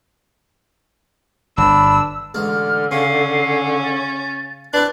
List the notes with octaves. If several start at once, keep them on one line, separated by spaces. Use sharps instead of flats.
G1 D4 B5 E6
A1 D3 G#3 F6
C#3 C#4 C7
A6
C4 D4 E4 B4 F#6